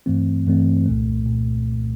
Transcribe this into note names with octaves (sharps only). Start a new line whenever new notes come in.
G2 E3 A3 C4
G2 E3 A3 C4
C2 A#2 A3
A#2